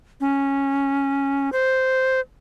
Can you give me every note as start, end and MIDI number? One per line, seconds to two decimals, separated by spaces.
0.21 1.50 61
1.53 2.20 72